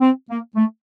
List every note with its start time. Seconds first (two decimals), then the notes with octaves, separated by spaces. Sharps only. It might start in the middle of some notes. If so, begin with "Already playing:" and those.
0.01 C4
0.30 A#3
0.56 A3